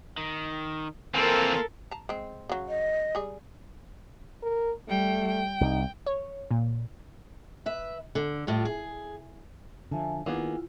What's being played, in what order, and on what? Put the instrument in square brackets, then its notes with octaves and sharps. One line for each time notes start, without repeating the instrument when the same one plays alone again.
[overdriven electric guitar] D#3
[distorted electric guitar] E3 C4 [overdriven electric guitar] A#3 F4 [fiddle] A4 A#4
[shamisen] A5 A#5
G#3 C4
C#3 F#3
[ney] D#5
[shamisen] G3 G#4
[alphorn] A#4
[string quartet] G3 G5 [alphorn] A3
[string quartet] G5
[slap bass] C2 [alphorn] D#4
[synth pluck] C#5
A#2
[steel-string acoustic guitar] B4 E5
D3
A2 G3 F4
G#4
[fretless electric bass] D3 F3 [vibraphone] E5 G#5 A5
[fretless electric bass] D#3 [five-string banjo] A#3 B3 G#4 [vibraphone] E4 F4